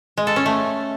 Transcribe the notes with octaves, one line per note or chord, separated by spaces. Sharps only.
G#3
A4
C#4
A3